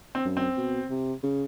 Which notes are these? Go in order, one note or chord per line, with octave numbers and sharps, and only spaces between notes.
C4
F#2
C4
B2
C3
C#3